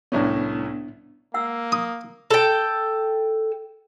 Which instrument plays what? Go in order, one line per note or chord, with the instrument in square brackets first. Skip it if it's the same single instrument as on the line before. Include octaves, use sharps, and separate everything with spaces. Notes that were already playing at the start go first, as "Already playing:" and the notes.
[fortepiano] C2 A2 C#4 [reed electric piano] B3 D4
[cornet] A#3 [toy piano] F#5 E6
[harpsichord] D#6
[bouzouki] A4 G5